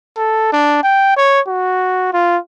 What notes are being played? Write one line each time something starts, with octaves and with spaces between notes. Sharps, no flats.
A4
D4
G5
C#5
F#4
F4